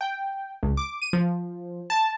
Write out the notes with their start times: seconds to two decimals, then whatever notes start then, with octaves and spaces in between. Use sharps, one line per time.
0.01 G5
0.63 C#2
0.77 D6
1.02 D#7
1.13 F3
1.90 A5